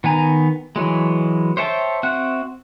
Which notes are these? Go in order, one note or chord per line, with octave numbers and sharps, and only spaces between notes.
D#3 B3 G#5 A#5
E3 F#3 G#3
C5 C#5 E5 G5 A5
C4 F#4 E5 F#5 F#6